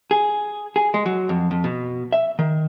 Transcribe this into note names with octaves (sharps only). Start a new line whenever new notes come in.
G#4
G#4
G#3
F#3
F2
F2
B2
E5
D#3